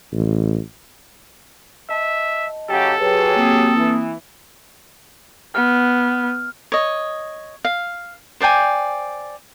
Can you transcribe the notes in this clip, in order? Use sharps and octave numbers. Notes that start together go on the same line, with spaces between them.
A1
D#5 E5 A5
C#3 F#3 G4 A4
F#3 G4 G#4 B4 C#5
A#3 C4 D#6
E3
B3 F6
C#5 D#5
F5
C5 D5 G5 G#5